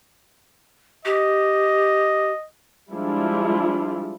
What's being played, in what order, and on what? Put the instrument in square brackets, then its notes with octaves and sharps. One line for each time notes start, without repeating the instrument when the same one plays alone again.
[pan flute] G4 [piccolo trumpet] D#5
[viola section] F3 G3 G#3 D4 E4 F4